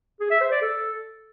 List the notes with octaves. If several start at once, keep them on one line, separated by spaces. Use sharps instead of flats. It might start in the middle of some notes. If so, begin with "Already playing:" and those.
G#4
E5
C5
D5
A4